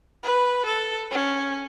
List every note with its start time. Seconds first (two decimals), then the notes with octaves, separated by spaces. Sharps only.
0.23 B4
0.66 A4
1.11 C#4